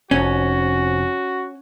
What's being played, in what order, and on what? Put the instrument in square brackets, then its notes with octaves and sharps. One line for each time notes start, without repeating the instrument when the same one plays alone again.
[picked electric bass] F1 [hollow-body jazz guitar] C#4 [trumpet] F#4